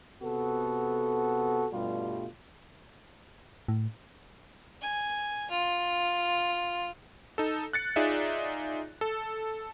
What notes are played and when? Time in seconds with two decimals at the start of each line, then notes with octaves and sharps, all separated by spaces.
0.22 C3 B3 F#4 A4
1.73 G2 B2 G3 A3 F4
3.68 A2
4.81 G#5
5.50 F4
7.38 D#4 A4
7.73 F#6 A6 C#7
7.96 D#4 F4 G#4 D5 E5
9.01 A4